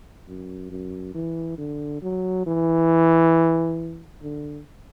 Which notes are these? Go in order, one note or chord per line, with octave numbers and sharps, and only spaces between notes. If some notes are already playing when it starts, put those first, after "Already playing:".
F#2
F#2
E3
D3
F#3
E3
D3